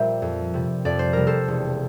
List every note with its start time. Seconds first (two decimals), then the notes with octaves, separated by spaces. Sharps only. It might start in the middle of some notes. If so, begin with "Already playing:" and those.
Already playing: A#2 G3 A#4 C5 D5 E5
0.22 F2
0.54 C3 G3
0.85 F2 D5
0.99 C5
1.13 C3 G3 A#4
1.27 A4 C5
1.48 E1